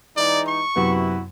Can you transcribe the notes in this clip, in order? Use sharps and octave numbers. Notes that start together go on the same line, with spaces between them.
E3 G#3 D#4 D5
C#6
F#2 C3 B3 E4 F#4